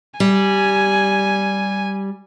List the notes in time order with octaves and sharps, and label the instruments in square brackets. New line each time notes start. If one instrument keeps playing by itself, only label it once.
[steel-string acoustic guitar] G3 [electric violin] G#5